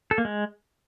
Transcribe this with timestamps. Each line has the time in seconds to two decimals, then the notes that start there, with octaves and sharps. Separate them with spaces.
0.11 A4
0.18 A#3
0.25 G#3